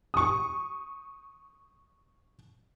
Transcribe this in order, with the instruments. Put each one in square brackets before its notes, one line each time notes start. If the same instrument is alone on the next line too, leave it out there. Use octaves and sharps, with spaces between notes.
[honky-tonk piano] C#6 D#6